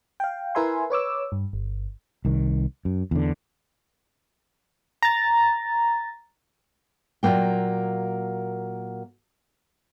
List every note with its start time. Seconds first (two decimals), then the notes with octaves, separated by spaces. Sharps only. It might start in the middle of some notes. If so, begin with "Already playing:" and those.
0.20 F5 G5
0.55 E4 A#4 B4 E5 G#5 C6
0.90 B4 C#5 D6 E6
1.32 G2
1.53 G1
2.25 C2 D#3
2.85 F#2
3.11 E2 D3
5.03 A#5 A6
7.23 A#2 F3 F#3 A#3 G5